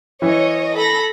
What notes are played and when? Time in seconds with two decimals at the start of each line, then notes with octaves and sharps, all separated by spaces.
0.22 E3 C#5 D#5
0.75 A4 B5 A#6